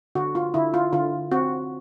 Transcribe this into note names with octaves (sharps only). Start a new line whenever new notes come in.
D3 F#4
F4
D3 E4
F4
D3 F4
C4 F#4